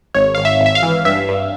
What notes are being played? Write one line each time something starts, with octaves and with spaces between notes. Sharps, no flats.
G#1 C#5
G#1 F5
E5
G#1
E5
F5
E3
G2 E5
G2